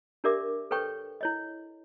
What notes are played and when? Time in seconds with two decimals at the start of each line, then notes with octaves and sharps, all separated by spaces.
0.24 D4 G4 A#4 D5 E5 D6
0.71 A4 B4 C#5 G5 C#6
1.21 E4 C#5 D#5